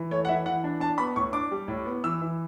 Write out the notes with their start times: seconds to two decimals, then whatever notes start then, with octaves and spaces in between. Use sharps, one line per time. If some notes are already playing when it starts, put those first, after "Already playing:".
Already playing: E3
0.11 A3 C#5
0.25 F#5
0.29 E3 E5
0.46 E3 F#5
0.64 D4
0.80 D4 A5
0.98 B3 B5
1.16 A2 C#6
1.33 D4 D6
1.51 G3
1.68 A2
1.85 B3
2.04 E3 E6
2.21 E3